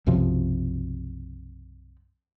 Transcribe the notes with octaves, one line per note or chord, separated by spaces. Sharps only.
B1 F#2 C3 F3